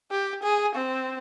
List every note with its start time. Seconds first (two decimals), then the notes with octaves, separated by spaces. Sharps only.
0.11 G4
0.43 G#4
0.75 C4